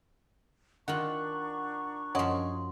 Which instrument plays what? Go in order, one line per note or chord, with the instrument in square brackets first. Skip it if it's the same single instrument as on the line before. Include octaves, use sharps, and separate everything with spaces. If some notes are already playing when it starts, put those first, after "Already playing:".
[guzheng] D#3 F4 [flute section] D4 A#5 C#6 [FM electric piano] F#5 F#6
[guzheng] F#2 F3 [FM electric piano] C#5 D#5 [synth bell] F#5 C6